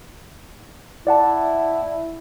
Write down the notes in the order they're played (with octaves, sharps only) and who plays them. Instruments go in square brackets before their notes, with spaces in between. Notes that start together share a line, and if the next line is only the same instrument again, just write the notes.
[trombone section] E4 [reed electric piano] D5 F#5 A5